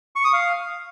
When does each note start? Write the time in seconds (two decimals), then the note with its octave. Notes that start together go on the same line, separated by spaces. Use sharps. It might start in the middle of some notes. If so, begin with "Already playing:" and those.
0.16 C#6
0.24 D#6
0.33 F5